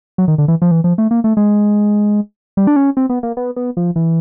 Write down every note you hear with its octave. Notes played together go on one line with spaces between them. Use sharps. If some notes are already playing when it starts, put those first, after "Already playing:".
F#3
D#3
D3
E3
F3
E3
F3
A3
A#3
A3
G#3
G3
D4
C#4
C4
B3
A#3
B3
B3
F3
E3